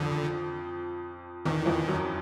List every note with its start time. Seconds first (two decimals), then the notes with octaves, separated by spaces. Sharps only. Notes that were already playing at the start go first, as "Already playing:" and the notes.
Already playing: F2 D3 F3
1.45 E2 D#3 E3
1.62 E3
1.66 F2 F3
1.88 F#2 F#3